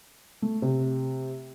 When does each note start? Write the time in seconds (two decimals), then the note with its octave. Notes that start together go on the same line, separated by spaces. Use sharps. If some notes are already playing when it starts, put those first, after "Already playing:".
0.42 A3
0.62 C3